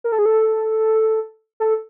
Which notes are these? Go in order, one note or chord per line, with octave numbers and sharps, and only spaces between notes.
A#4
A4
G#4
A4
A4